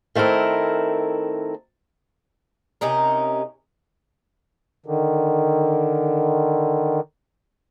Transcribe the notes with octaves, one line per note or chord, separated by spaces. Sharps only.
D#3 A3 C4 E4 A#4
C3 C#4 D#4 A#4
D3 D#3